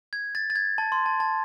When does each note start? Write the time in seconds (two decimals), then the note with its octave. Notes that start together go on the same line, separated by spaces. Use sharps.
0.13 G#6
0.35 A6
0.50 A6
0.56 G#6
0.78 A5
0.92 C6
1.06 A5
1.20 A5